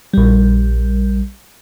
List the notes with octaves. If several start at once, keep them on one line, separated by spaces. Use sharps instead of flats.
A#1 G3